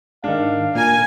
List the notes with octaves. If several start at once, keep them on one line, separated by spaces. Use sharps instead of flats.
G#2 D#3 D4 F5
A#2 A#4 G#5